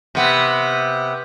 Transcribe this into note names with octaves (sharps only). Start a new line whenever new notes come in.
C3 B3